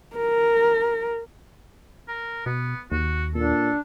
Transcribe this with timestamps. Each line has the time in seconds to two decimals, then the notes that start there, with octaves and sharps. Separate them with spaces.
0.16 A#4
2.09 A#4
2.46 B2 B3
2.92 D#2 F#4
3.35 A#2 D4 A4